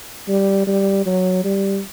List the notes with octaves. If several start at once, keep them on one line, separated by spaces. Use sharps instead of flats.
G3
G3
F#3
G3